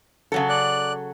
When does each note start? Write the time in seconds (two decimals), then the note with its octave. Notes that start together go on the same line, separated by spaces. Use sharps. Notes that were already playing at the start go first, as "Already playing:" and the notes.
0.32 C#3 F#3 A4
0.49 D5 F#6